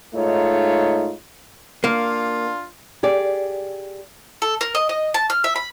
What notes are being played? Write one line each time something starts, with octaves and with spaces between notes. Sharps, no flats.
G#2 A3 D#4 F4 C#5
A#3 D4 F4
G4 G#4 D5
A4
A#4
D#5
D#5
A5
F6
E5
B5